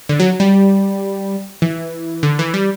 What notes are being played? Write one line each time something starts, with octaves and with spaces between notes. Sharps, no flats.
D3
F#3
G3
E3
D3
E3
G3